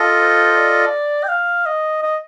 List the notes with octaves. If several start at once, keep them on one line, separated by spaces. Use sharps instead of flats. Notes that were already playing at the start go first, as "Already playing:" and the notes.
Already playing: F4 A4 D#5
C5
D5
G5
F5
D#5
D#5